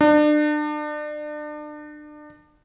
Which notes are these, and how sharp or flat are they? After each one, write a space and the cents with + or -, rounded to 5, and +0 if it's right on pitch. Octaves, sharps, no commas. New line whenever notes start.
D4 +35